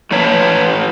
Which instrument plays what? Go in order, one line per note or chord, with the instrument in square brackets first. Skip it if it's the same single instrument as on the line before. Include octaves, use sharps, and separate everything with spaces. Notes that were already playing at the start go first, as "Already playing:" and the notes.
[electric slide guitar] A2 E3 C#5 A5 A#5